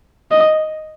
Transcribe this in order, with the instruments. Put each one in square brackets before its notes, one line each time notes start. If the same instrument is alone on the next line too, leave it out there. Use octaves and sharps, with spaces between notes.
[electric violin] D#5